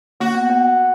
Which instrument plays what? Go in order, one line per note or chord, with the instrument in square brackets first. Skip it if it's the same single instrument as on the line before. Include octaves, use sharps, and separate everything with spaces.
[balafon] A#3 [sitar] F#4
[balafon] B3
B3